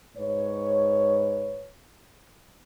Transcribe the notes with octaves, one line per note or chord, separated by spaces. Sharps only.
G#2 B4 C#5